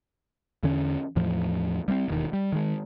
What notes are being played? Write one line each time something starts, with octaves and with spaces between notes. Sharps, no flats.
E2 D3 C#4
E2 A2 F3
G3 A#3 C4
E1 D#2 D#3
G3
D#3 G#3